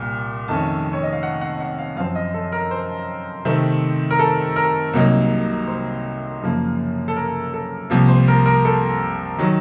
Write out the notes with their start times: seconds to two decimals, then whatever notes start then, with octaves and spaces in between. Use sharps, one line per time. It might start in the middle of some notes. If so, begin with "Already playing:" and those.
Already playing: C2 A#2
0.48 F2 D#3 A3 C#4 A5
0.93 C#5
1.03 D#5
1.13 F5
1.23 F#5
1.41 F#5
1.60 F#5
1.78 F5
1.96 F#2 F3 C4 F5
2.15 D#5
2.34 A4
2.52 A#4
2.71 C5
3.45 C3 D#3 A3 C4
4.11 A#4
4.19 A4
4.56 A#4
4.93 C2 C3 F#3 A#3 D#4
5.67 C5
6.42 F#2 C#3 F3 A#3
7.08 A4
7.16 A#4
7.54 A4
7.90 C2 C3 F3 A#3
8.09 C5
8.28 A#4
8.46 A#4
8.65 A4
9.38 D#3 F#3